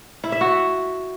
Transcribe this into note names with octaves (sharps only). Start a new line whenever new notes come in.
E4
E5
F#4